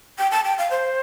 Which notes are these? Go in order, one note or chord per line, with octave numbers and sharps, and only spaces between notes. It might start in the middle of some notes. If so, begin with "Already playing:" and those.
G5
A5
G5
F5
C5